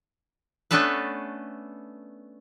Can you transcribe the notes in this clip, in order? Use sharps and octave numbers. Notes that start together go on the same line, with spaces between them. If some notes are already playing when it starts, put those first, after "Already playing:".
A3 B3 C#4 D4 A4 B4